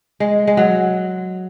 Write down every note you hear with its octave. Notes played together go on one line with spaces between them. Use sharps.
G#3
G#3
F#3